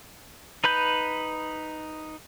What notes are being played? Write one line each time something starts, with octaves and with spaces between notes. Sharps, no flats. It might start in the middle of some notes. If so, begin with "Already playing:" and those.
D#4 B4 B5 G6